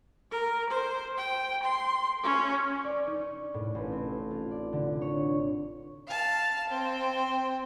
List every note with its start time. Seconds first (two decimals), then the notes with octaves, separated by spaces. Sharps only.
0.31 A#4
0.69 C5
1.18 G5
1.63 C6
2.23 C#4
2.84 D5
3.07 D#4
3.21 C#6
3.54 A2
3.75 A1
3.92 C4
4.31 F4
4.51 D5
4.73 D3
5.01 C#5
6.07 F5 A5
6.69 C4 C5